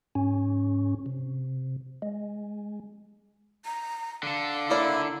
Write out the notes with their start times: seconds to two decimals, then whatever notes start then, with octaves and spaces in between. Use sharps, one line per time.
0.15 G#2 C#4
1.06 C3
2.02 G#3
3.65 A#5
4.23 D3 A4 F5
4.70 A#3 E4 A#4 D5